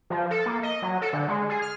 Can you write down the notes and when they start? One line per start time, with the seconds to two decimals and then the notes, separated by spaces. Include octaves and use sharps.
0.10 F3
0.31 A4
0.46 A#3
0.63 D#5
0.82 F#3
1.02 A4
1.13 D3
1.28 G#3
1.49 G#4
1.62 F6